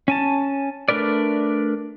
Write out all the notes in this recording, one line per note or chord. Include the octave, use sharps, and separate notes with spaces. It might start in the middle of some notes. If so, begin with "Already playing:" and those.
C#4 G#5 A5
A3 D4 A#4 B4 D5